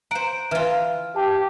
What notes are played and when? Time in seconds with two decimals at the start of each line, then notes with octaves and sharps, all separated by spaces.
0.11 C5 F#5 A#5 D7
0.51 E3 F4 E5 F6
1.16 G4 A5